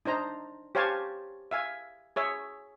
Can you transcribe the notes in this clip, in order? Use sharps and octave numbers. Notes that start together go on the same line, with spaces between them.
D4 D#4 C5 A#5
G4 C5 C#5 F5 G#5 A5
E5 F5 G#5
G#4 C#5 E5